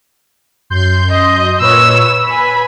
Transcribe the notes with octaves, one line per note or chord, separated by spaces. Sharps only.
F#2 C6 G6
D#5
A#2 B4 C#5 E6
B4 G#5 B5